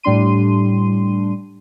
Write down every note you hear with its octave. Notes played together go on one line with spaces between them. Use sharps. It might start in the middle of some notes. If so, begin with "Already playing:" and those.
A2 G3 D4 C6 D#7